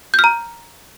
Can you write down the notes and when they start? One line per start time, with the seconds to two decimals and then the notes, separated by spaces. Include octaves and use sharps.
0.14 G6
0.19 F6
0.24 A#5